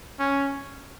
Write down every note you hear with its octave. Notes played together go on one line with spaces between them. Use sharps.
C#4